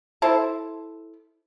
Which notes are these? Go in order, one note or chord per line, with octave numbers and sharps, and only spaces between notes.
E4 A4 C5 A5